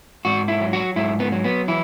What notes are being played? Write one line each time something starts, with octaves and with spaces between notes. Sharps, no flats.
G#2 F#4
E4
F#3
F#4
G#2 E4
B3
F#3
B3
E3 E4